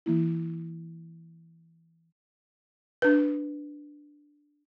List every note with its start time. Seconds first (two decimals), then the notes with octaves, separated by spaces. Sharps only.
0.06 E3 A#3 E4
3.02 D4 B4